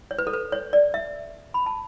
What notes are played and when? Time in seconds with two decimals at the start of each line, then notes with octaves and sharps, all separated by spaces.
0.11 C#5
0.19 B4
0.27 A4
0.33 B4
0.52 C#5
0.73 D5
0.94 E5
1.54 B5
1.66 A5